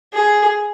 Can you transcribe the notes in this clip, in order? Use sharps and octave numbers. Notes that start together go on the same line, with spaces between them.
G#4